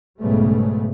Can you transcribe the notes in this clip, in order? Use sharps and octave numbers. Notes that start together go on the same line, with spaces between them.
B1 G#2 C#3 G3 A3 B3